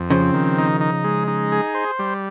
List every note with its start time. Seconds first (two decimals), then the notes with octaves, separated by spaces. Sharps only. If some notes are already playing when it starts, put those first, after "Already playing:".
Already playing: F2
0.10 C#3 F3 C4
0.34 D#3
0.58 D#4
0.81 D#4
1.04 G#3
1.28 D#4
1.52 G#4
1.75 C5
1.99 G3